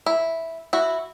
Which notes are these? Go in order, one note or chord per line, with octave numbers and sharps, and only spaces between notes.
E4
E4 F#4